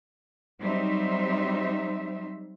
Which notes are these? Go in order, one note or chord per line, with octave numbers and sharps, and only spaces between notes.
F#3 G3 C4 D#4 C5 E5